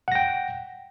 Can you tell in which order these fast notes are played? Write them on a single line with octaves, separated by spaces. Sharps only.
F#5 A#6 G5